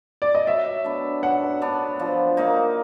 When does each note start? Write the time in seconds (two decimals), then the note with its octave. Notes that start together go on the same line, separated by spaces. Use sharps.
0.22 D5
0.35 D#5
0.47 F#3 E5
0.84 B3 D4
1.23 F#3 F#5
1.62 B3 D4
1.99 F3
2.37 A#3 D#4